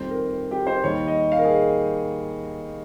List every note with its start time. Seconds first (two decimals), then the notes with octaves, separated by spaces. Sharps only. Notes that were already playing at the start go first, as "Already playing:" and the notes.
Already playing: F2 D#3 G3 C5
0.10 A#4
0.51 G4
0.67 C5
0.84 D#2 D#3 G3 C#5
1.07 D#5
1.32 F5
1.38 A#4
1.44 G#4